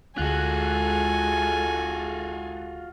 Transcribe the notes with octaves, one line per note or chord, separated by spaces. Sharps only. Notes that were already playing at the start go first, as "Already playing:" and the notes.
D2 G#3 F4 F#4 G#4 A4 G#5 F#6